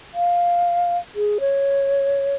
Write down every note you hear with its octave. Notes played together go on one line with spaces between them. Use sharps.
F5
G#4
C#5